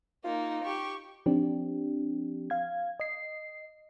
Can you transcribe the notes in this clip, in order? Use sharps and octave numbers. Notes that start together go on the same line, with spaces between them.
A#3 D#4 F4
G4 C#6
F3 C4 D4 G4
F5 G#6
D#5 C7